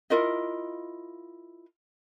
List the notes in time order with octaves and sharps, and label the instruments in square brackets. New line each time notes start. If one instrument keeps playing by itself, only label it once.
[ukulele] E4 F4 A#4 D#5